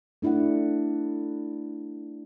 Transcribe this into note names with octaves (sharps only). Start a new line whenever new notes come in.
A3 D4 E4 D5 F#5